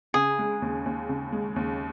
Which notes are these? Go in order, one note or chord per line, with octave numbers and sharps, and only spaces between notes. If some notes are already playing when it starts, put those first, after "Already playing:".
C#3 G#4
G#3
D#2
D#2
C#3
G#3
D#2